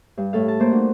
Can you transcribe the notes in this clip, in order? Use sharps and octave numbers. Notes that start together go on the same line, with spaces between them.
G2
A2 A4 F5
A5
A3 A#3 C5
D4 F#4